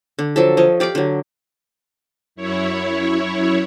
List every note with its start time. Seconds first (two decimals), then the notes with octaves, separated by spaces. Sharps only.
0.19 D3
0.36 F3 F#3 A4
0.57 F3 C#5 D#5
0.80 G4 D5 F5 D6
0.95 D3 F#3
2.36 F#2 E4 C#5